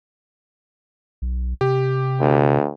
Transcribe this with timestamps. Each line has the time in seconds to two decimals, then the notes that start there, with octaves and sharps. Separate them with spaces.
1.22 B1
1.61 C3 G4
2.20 D2